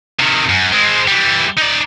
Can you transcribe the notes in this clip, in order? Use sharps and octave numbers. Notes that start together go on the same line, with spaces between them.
C3 D#3
F#2
G#3 C4
E3 G3
D#4 D5